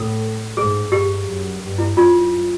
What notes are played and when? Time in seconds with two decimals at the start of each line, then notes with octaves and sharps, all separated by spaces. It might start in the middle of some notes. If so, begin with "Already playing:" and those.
Already playing: A2 A4
0.57 G#2 G#4
0.92 G2 G4
1.27 F#2
1.61 G2
1.78 E4
1.96 F#2 F4